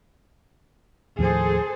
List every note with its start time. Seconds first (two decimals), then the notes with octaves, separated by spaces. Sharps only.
1.19 D#2 A2 F3 G#4 A4 C5